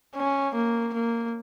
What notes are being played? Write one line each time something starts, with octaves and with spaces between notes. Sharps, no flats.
C#4
A#3
A#3